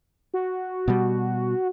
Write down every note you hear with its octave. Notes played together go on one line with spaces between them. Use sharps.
F#4
B2 G3